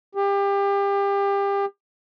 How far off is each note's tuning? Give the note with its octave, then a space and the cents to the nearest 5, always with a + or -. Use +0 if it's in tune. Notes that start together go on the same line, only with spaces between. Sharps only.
G4 +30